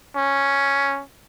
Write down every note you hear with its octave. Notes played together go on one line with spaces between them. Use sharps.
C#4